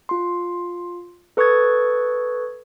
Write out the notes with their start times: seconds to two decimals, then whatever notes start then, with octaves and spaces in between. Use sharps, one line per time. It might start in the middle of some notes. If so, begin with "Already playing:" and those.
0.09 F4 C6
1.37 A4 B4 C#6 D#6 G#6 A6